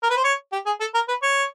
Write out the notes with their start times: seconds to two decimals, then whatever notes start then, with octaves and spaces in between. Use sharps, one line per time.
0.03 A#4
0.10 B4
0.17 C5
0.24 C#5
0.52 G4
0.66 G#4
0.80 A4
0.94 A#4
1.08 B4
1.23 C#5